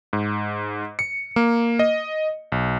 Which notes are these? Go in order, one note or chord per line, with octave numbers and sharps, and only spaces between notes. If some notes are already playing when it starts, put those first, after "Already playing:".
G#2
C#7
A#3
D#5
B1